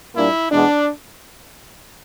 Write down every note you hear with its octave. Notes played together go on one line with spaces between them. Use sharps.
A#2 G3 A#3 D4 E4
E2 B2 G#3 B3 D4